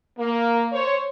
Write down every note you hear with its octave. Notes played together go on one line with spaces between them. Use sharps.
A#3
C5 C#5